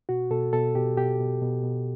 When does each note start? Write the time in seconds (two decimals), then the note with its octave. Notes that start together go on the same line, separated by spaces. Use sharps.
0.09 B2 F#4
0.31 B2 A4
0.53 B2 A4
0.75 B2 G4
0.97 B2 G4
1.20 B2
1.41 B2
1.63 B2